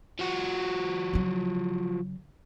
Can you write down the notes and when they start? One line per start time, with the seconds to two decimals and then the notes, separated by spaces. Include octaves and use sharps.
0.19 F3 F#4
1.14 C#3 F#3